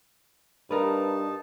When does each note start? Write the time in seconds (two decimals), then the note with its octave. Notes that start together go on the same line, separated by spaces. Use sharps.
0.71 G2 D#4 A#4 B4 A5